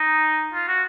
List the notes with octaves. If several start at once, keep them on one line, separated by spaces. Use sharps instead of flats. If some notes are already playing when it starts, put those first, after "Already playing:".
Already playing: D#4
F4
F#4